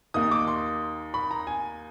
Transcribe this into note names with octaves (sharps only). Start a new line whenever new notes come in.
D#2 D#3 D#6
D6
C6
B5
A#5
G#5